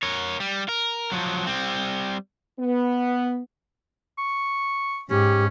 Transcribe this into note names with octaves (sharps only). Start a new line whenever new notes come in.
A#4 C#5
G3
A#4
F3 F#3
G3 C4
B3
C#6
G#2 C#4 G4